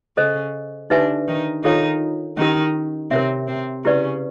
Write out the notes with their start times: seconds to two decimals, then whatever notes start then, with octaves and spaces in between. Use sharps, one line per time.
0.17 C#3 C#4 A4 C5 D#5
0.90 D3 D4 D#4 G4 B4 E5 G#5
1.28 D#3 D#4
1.64 D#3 D#4 F4 A4 C#5 F5
2.37 D#3 C#4 D#4 E4 G4 A#4
3.11 C3 C4 A#4 C#5 E5
3.48 C3 C4
3.84 C#3 C#4 E4 G4 B4 D5